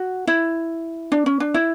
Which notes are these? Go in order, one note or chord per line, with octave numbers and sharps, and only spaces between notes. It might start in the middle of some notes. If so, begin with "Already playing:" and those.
Already playing: F#4
E4
D4
C#4
D4
E4